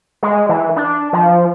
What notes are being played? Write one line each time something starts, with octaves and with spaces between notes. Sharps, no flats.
G#3
E3
D4
F3